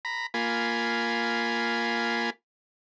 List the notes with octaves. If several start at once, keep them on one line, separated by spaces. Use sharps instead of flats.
A#5 B5
A#3 F4 G#5 B5